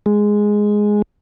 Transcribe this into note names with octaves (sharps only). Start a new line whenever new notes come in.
G#3